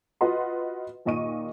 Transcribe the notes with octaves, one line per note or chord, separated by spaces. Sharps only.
F4 F#4 B4 D#5 F#5 C6
D#2 A#2 D#5 C#6 D#7